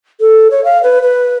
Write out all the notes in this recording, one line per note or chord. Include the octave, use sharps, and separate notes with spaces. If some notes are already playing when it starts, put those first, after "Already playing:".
A4
C#5
F5
B4
B4